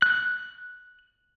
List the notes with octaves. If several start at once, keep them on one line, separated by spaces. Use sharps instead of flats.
F#6